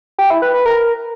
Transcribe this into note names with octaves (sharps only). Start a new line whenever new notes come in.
G4
E4
B4
B4
A#4